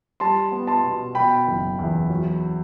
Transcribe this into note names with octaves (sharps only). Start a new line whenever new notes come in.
G3 A5 C6
B3
A5 C6
B2
B2 G5 B5
F#1
E2
F#3